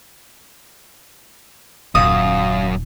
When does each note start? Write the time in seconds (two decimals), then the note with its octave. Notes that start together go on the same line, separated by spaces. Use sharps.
1.95 D#1 F#2 F5 D#6